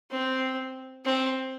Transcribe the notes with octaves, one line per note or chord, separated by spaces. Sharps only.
C4
C4